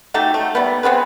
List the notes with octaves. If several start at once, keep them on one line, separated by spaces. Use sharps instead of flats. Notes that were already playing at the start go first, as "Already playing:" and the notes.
A3 D#4 F#4 G4
A3
G3 A3 B3
B3 C4 G#4 B4